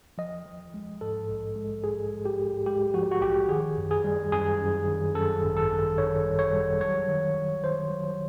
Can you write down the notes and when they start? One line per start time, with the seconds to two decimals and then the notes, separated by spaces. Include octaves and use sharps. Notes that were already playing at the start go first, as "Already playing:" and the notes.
0.18 F3 D#5
0.46 F3
0.74 G#3
1.01 G#2 A4
1.29 A#1
1.56 G#3
1.84 G#2 G#4
2.12 G#3
2.25 G4
2.39 G#2
2.66 G#3 G4
2.94 F3 F#4
3.11 F#4
3.22 A#1 G4
3.49 D#3 G#4
3.77 F#2
3.91 G#4
4.04 G3
4.32 F#2 G#4
4.60 F#2
4.87 D#3
5.15 F#2 A4
5.43 G#1
5.57 A4
5.71 D#3
5.97 D#3 C#5
6.25 G3
6.39 C#5
6.53 G3
6.80 F#3 C#5
7.08 D#3
7.36 D#3
7.63 D#3 C5
7.90 F#3